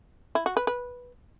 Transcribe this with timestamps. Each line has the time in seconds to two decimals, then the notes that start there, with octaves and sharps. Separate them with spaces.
0.35 E4
0.46 F#4
0.57 B4
0.67 B4